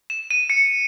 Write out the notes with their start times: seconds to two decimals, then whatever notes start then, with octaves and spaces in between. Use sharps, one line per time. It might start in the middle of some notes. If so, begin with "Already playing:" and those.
0.10 E7
0.31 D#7
0.50 C#7